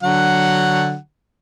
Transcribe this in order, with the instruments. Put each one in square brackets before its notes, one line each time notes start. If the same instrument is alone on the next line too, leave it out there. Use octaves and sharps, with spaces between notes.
[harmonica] D3 F#3 F#5